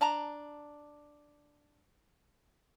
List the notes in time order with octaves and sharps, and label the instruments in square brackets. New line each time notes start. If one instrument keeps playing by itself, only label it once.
[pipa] D4 A5 A#5